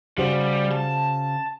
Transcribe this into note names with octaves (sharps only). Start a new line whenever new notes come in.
C#3 G3 F#4 C5
A5